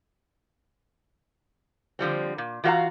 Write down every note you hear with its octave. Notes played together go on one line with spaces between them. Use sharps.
D3 F3 G3 C4
A#2
E3 F4 F#4 C5 F5 A#5